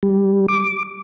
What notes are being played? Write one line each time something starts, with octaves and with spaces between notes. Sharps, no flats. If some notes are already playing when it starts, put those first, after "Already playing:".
G3
D6